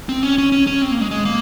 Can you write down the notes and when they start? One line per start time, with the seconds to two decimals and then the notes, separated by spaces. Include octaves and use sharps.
0.09 C4
0.23 C#4
0.38 C#4
0.52 C#4
0.67 C#4
0.82 C4
0.91 A#3
1.01 G#3
1.11 G#3
1.25 A#3